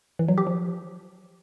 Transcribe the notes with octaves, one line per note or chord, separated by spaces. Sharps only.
E3
F#3
G4
F3